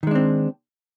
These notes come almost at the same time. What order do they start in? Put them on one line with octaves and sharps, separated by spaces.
D#3 G#3 D4 C4